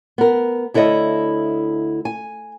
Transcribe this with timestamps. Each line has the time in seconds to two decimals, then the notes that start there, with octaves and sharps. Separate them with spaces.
0.18 B3 A#4
0.74 D2 E4 A4 C#5 D#5
2.05 G#5